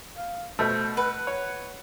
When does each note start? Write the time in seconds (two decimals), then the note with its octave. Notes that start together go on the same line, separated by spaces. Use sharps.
0.16 F5
0.59 B2 A3 C5
0.97 B4 F#5
1.27 C#5